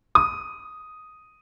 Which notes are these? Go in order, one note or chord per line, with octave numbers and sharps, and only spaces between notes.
D#6